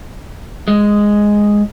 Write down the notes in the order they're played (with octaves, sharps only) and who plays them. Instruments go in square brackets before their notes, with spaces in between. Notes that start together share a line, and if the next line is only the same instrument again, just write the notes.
[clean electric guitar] G#3